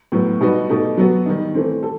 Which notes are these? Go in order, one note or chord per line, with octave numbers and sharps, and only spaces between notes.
A2 F#3 B3
B2 G3 D#4 F#4 B4
B2 A3 D#4 G4
F#3 B3 F#4
D#3 G3 D#4
E3 A3 C4
A4